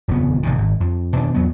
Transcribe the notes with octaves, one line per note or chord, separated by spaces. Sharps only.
D#1 F2 C#3 B3
A1 C3 D#3
G#1
F2
B2 D#3 D4
E2 F#3 B3